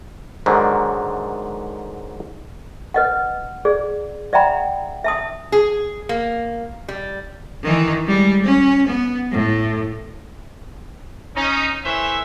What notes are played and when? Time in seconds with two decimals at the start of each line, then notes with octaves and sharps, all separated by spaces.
0.46 G#2 D3 D#3 F#3
2.94 B4 D#5 F#5
3.65 G#4 D5
4.33 D5 E5 F#5 G5 A#5 B5
5.04 E5 A5 D#6
5.52 G#4
6.09 A#3
6.88 G3
7.63 D#3 E3
8.07 G3 G#3
8.43 C#4
8.87 B3
9.32 A2
11.36 C#4 D#4
11.84 E3 A3 C5 C#5 E5